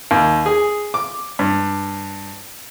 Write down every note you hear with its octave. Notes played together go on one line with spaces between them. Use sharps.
D#2
G#4
D6
G2